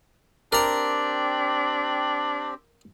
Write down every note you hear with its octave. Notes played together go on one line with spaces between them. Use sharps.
C4 D4 G4 A#4 A#5